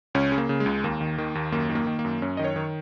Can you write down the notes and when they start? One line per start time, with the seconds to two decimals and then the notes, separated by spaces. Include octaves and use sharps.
0.15 C#2 C#4
0.32 C#3
0.38 A#3
0.49 C#3
0.60 G#3
0.66 C#2
0.84 D#2 A#3
1.01 D#3
1.18 D#3
1.35 D#2
1.52 F#2 A#3
1.70 D#3
1.75 A#3
1.87 D#3
1.99 A#3
2.05 F#2
2.22 F#2 C#4
2.37 D#3 D#5
2.44 C#5
2.56 D#3